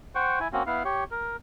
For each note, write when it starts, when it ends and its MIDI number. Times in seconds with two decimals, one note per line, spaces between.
0.15 0.39 72
0.15 0.39 78
0.15 0.39 79
0.15 0.39 85
0.40 0.48 64
0.40 0.48 80
0.53 0.63 58
0.53 0.63 60
0.53 0.63 61
0.53 0.63 66
0.67 0.83 59
0.67 0.83 64
0.67 0.83 77
0.85 1.04 67
0.85 1.04 73
1.11 1.36 70